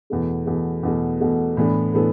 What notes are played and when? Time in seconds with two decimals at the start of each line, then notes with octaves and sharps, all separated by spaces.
0.10 E2 B2 A3
0.47 E2 B2 A3
0.83 E2 B2 A3
1.20 E2 B2 A3
1.57 A2 E3 B3 D4 A4
1.94 A2 E3 B3 D4 A4